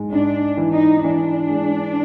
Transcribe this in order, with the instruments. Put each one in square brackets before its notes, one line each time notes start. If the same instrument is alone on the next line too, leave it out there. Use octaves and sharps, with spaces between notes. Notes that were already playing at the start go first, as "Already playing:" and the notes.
Already playing: [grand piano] G#2 G#3
[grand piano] G#2 [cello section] D4
[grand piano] E3
[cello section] D#4
[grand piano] E3 [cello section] D4
[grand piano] G#3